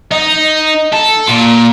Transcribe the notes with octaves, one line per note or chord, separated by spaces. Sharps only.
D#4
A4
A#2